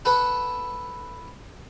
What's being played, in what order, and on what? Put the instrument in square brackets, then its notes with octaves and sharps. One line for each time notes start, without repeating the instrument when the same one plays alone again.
[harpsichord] A4 B4 F#5